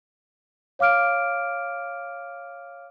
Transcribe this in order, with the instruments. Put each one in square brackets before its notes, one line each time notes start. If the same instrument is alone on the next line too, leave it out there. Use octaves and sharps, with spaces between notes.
[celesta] C#5 F5 D6 F6 D7